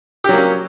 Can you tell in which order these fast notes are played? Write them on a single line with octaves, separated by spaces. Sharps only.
G4 F#3 A#3 C#4